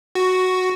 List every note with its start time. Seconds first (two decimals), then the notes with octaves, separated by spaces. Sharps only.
0.15 F#4